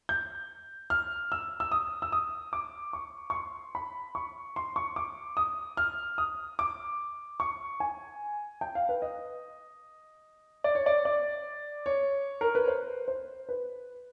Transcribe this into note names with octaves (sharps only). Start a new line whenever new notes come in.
G6
F6
E6
E6
D#6
E6
D#6
D6
C#6
C#6
C6
B5
C#6
C6
C#6
D6
D#6
F6
D#6
D6
C#6
G#5
G5
F5
B4
D#5
D5
C#5
D5
D5
C#5
A#4
B4
C5
C5
B4